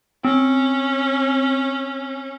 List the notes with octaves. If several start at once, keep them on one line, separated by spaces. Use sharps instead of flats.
C4 C#4